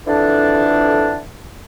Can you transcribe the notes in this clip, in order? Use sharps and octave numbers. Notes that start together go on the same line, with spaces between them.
F2 D3 E3 D4